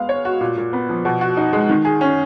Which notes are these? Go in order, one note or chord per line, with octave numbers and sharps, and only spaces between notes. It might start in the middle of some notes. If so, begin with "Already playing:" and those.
Already playing: G#3 B3 F5
C#5
F#4
A#2
A#2
B3
F3
B2
F#4
D#4
G#3
D#3
G#4
C#4